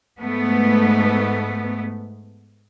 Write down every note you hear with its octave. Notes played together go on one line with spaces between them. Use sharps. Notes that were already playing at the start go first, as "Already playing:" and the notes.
G#2 A3 B3